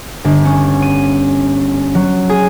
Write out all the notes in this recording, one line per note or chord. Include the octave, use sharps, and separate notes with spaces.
G1
C#4
D#7
F#3
G#4